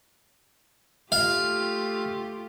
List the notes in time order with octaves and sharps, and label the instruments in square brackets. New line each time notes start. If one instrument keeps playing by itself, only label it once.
[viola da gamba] A3 F4 G4 [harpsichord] F5